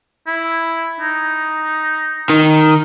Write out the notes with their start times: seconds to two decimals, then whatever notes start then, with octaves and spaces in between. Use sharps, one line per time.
0.27 E4
1.00 D#4
2.30 D#3